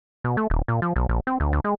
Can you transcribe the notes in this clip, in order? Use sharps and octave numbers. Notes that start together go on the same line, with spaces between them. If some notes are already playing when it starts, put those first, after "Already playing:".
B2
A3
D#1
A#2
F3
B1
A#1
C4
D2
D2
G#3